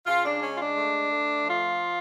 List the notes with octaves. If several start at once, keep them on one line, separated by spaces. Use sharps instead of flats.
C#3 F4
D4
G#3 C#4
F4
D4
A3
A3
F3 F4